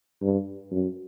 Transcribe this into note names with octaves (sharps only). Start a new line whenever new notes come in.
G2
F#2